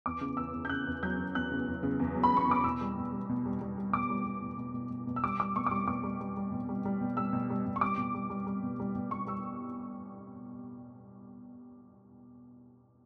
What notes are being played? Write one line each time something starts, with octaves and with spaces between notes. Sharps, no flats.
E2 D6
C#3
E2 E6
E2
G6
C#3 F#6
E2
F#3 G6
E2
E2 F#6
C#3
E2
C#3
E2
F#3
B5
F#3 C#6
C#3 D6
B2 E6
G3
B2
G3
B2
G3
G3
G3
B2 D6
G3
G3
B2
B2
B2
B2
B2
E6
G3 D6
G3 D6
B2 C#6
D6
G3 C#6
B2 D6
G3
G3
G3
B2
G3
G3
B2
G3 E6
B2
G3
B2
C#6
G3 D6
B2
G3
G3
G3
B2
G3
B2
G3 C#6
G3 E6